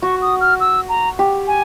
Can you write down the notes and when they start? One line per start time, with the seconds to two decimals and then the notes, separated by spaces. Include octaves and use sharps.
0.02 F#4 C#6
0.22 D#6
0.41 F6
0.60 E6
0.89 A#5
1.19 G4
1.47 G#5